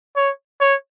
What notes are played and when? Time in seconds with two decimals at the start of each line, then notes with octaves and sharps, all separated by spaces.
0.17 C#5
0.61 C#5